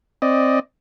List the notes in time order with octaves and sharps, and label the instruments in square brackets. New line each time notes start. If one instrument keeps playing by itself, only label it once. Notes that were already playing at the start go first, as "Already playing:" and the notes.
[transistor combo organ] C4 D5 D#5